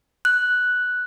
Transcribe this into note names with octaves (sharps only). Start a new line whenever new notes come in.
F#6